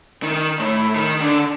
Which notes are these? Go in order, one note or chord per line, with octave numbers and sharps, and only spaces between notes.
D#3
A2
D#3
D3